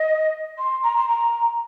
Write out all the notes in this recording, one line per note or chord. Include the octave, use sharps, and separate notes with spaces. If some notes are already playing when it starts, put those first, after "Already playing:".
Already playing: D#5
C6
A#5
C6
A#5